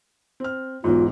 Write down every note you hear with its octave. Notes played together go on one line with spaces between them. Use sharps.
C4 F6
B1 E2 G#2 F4